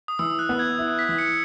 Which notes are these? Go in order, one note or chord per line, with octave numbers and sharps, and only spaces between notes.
D#6
E3 E6
F#6
B3
G#6
E4
B6
E3
C#7